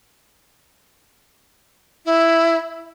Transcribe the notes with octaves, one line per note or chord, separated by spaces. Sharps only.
E4